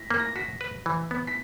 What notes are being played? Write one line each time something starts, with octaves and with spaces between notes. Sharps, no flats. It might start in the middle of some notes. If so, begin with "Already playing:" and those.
Already playing: A#6 B6
A#3
A#6
F#4 B6
B4
E3
B3
B6